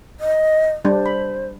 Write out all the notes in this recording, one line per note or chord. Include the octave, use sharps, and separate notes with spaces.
D#5
G3 D4 C5
B5